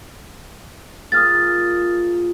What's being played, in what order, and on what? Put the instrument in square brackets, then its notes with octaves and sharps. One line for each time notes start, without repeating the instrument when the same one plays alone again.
[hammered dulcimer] A#2 G#4 [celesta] D#6 F6 A6